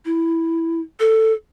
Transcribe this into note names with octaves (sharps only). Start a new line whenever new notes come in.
E4
A4